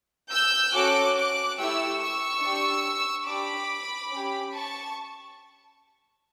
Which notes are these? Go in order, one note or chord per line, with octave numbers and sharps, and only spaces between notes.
E6 G6
C#4 F#4 A4 D6 F#6
D6 F#6
A3 E4 G4 C#6 E6
C#6 E6
D4 G4
D4 G4 B5 D6
C#4 G4
A5 C#6